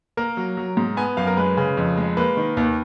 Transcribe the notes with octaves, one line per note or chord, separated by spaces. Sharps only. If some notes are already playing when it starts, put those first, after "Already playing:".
A#3 A#4
F#3
F#3
G#2
B3 G#5
F#2 F5
A#4
G#3 B4
C#3
F2
G#3
A#3 B4
D#3
D#2